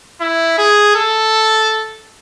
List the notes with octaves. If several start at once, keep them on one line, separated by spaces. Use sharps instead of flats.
E4
G#4
A4